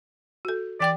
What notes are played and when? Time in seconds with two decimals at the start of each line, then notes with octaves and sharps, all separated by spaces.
0.45 F#4 A4
0.80 E3 D5 G5 D6